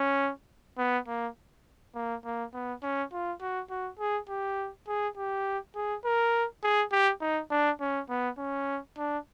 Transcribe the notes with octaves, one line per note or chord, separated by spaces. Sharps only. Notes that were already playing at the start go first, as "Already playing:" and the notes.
Already playing: C#4
B3
A#3
A#3
A#3
B3
C#4
F4
F#4
F#4
G#4
G4
G#4
G4
G#4
A#4
G#4
G4
D#4
D4
C#4
B3
C#4
D4